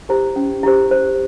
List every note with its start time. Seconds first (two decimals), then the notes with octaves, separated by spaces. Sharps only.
0.09 E4 G4 C5
0.36 C#4
0.63 E4 G4 C5
0.91 C5